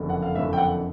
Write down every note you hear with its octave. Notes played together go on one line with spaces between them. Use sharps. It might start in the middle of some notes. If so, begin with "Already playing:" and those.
Already playing: F#1 F2 D3
F#5
F5
F#1 F2 D3 E5
G5
F#5